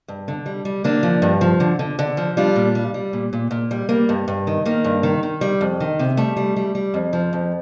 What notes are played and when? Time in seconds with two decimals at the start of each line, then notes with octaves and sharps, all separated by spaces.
0.08 G2
0.28 D3
0.46 G3
0.65 G3
0.84 D3 A#3 D4
1.03 F3
1.22 G2
1.41 F3
1.60 D3
1.79 D3
1.99 D3
2.17 F3
2.37 G3 D4 F4
2.56 A#2
2.75 G3
2.94 G3
3.13 A#2
3.33 A#2
3.51 A#2
3.71 G3
3.89 G3 A#3
4.09 G2
4.28 G2
4.47 D#3
4.65 D#3 A#3
4.85 G2
5.03 D#3
5.23 D#3
5.41 G3
5.61 F2
5.80 D#3
5.99 C3
6.17 G3 A3
6.37 G3
6.56 G3
6.75 G3
6.94 F2
7.13 F3
7.33 F2